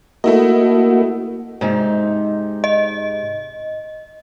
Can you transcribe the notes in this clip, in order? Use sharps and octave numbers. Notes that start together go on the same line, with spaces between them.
A3 A#3 E4 F#4 D#5
G#2 C3 D#4
D#5